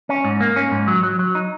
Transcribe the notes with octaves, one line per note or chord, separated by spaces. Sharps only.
C#4
G#2
A#3
C#4
G#2
F#3
F#3
F#3
D#4